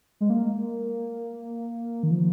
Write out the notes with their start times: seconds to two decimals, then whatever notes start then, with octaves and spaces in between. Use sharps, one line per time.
0.21 G#3
0.30 A#3
2.03 D#3
2.11 F3